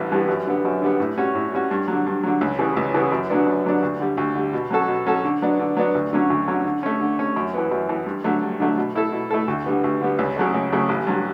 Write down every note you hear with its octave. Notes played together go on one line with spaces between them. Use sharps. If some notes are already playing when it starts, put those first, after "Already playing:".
Already playing: A1 G2 E3 G3 B3
G2 E3 G3 B3
F#2
D3 G3 B3
F#2
D3 G3 B3
A2
G3 C#4 F#4
A2
G3 C#4 F#4
G2
D3 F#3
G2
D3 F#3
C#2
C#3 E3 G3 B3
C#2
C#3 E3 G3 B3
F#2
D3 F#3 B3 D4
F#2
D3 F#3 B3 D4
D2
D3 G3
D2
D3 G3
B2
F#3 C#4 F#4 A4
B2
F#3 C#4 F#4 A4
D3
F#3 B3 D4
D3
F#3 B3 D4
D2
D3 F#3 C#4
D2
D3 F#3 C#4
D3
A3 C#4
D3
A3 C#4
F#2
E3 B3
F#2
E3 B3
G2
D3 F#3 A3
G2
D3 F#3 A3
B2
A3 E4 A4
B2
A3 E4 A4
D2
D3 G3 B3
D2
D3 G3 B3
C#2
C#3 F#3 A3
C#2
C#3 F#3 A3
A1
G2 F#3